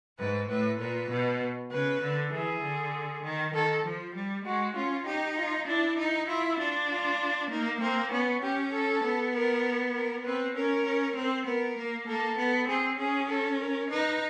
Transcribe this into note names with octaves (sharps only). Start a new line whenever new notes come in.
G#2 B4
A2 B4
A#2 B4
B2
C#3 B4
D3
E3 G#4
D3
D#3
D#3 A4
F3
G3
G#3 F#4
C#4 F4
D#4 G4
F4
D4 E4
D#4
E4 F4
D4 F4
F4
A#3 D#4
A#3 C4
B3 C#4
C#4 G4
A4
B3
A#4
A#4
C4 B4
C#4 A#4
C#4
C4
B3 A#4
A#3
A#3 A4
B3
C4 G#4
C#4 G#4
A4
A#4
D#4 B4